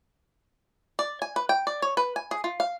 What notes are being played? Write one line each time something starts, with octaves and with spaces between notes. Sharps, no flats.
D5
G#5
B4
G5
D5
C#5
B4
G#5
G#4
F4
F5